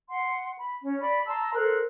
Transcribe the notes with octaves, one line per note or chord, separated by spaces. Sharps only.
F#5 C6
B5
C#4
D5 B5
A5 A#5 C6 E6
A4 A#4 C5 F#6